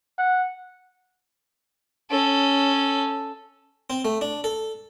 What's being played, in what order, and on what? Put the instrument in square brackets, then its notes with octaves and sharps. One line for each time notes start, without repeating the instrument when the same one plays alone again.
[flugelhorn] F#5
[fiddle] C#4 A4
[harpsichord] C4
A3
D4
A4